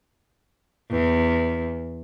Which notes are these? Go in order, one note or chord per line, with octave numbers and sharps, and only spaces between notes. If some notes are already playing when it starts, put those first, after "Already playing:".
E2